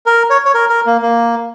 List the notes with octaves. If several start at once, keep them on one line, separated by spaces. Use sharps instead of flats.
A#4
C#5
C#5
A#4
A#4
A#3
A#3